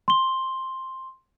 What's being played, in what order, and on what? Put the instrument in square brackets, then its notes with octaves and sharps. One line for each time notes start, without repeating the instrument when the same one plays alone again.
[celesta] C6 G7